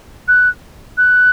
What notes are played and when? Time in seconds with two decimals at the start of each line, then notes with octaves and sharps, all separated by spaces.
0.28 F#6
0.97 F#6